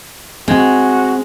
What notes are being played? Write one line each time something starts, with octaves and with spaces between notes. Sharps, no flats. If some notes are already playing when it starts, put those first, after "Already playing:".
G#3 C4 F#4